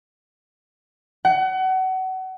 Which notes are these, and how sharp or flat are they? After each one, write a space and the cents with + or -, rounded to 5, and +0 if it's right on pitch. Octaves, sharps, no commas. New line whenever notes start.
F#5 +30